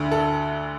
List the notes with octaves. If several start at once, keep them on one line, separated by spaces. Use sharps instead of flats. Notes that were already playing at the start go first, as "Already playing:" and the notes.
Already playing: D2 D3
A4